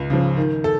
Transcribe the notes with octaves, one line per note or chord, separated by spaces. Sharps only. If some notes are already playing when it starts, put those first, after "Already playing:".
Already playing: C#2
C#3 F3
D#3
A4